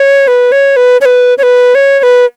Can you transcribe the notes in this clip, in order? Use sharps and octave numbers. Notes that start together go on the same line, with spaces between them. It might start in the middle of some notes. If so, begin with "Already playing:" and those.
Already playing: C#5
B4
C#5
B4
C#5
B4
C#5
B4
C#5
C#5
B4